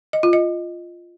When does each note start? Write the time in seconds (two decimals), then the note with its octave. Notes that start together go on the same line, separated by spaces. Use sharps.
0.13 D#5
0.23 F4
0.33 D#5